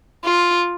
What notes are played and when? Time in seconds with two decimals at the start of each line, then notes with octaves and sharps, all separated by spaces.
0.24 F4